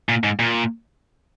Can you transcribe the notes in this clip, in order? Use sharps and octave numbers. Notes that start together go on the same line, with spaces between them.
A#2
G#2
A#2